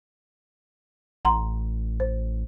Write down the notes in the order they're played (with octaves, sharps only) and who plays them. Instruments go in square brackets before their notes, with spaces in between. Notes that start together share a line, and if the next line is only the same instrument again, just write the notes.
[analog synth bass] A1 [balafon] F#5 A#5 C6
[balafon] C5